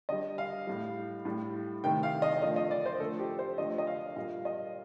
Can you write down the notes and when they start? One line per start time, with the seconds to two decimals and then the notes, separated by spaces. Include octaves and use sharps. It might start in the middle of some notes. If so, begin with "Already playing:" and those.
0.09 D3 G3 D#5
0.38 F5
0.67 A2 G3
1.25 A2 G3
1.83 C3 D#3 A3 G5
2.03 F5
2.22 D#5
2.42 D3 F3 A3 D#5
2.56 D#5
2.71 D5
2.86 C5
2.99 D3 F3 A3 A4
3.19 G4
3.39 C5
3.58 D3 F3 A3 D#5
3.78 D#5
3.87 F5
4.16 A#2 G3 F5
4.45 D#5